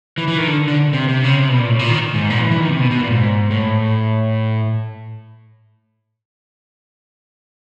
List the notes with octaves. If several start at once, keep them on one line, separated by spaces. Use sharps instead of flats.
E3
E3
D#3
D3
D3
C3
C3
C#3
C3
B2
A#2
A2
A#2
D#3
G#2
A#2
E3
E3
D#3
C3
B2
B2
A#2
G#2
A2